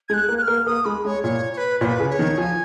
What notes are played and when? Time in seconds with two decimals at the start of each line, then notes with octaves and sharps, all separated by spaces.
0.09 G#3 G#6
0.14 F#6
0.29 A#3
0.38 F#6
0.42 F6
0.48 A#3
0.66 A#3 D#6
0.85 G#3 B5
1.05 G#3 C#5
1.23 A#2 C#5
1.53 C#5
1.57 B4
1.81 A#2 C#5
1.85 B4
2.00 C#3
2.10 C#5
2.19 D#3
2.38 F3 G#5